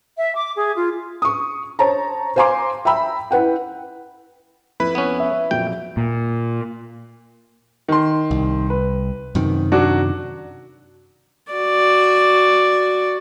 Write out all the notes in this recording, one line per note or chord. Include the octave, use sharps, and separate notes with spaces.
E5
D6
G#4
F4
C#6 D#6
C5 C#5 A5 A#5
C5 F5 G#5 A#5 C6 D6
E5 G5 A#5 B5 E6
E4 B4 F#5 G5
F2 E4 B4 B5
B3 C#4
E5
F2 A#2 F#3 G5
A#2
D#3 C6
C2
B4
F#2 C3 D#3
F#3 D4 F#4
F#4 D5